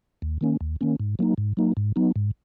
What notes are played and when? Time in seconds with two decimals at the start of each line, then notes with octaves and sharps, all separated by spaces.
0.22 D#2
0.41 D#3 A#3 C#4
0.61 D#2
0.81 D#3 A#3 C#4
1.00 G#2
1.19 F#3 A#3 D#4
1.38 G#2
1.57 F#3 A#3 D#4
1.77 G#2
1.96 F#3 B3 D#4
2.16 G#2